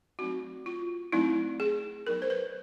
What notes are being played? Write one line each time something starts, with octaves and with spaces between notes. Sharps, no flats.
F#3 A3 C4 D#4 F#4
F4
F#3 A3 C4 D#4 E4
G#4
F#3 B3 D#4 A#4
C5
B4